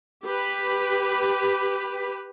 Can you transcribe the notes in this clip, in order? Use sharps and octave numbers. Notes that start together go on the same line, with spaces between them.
G4 B4